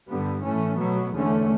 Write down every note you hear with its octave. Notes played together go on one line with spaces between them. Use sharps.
G2 D3 G3 B3
A2 E3 A3 C#4
B2 F#3 B3
E2 D3 A3 C#4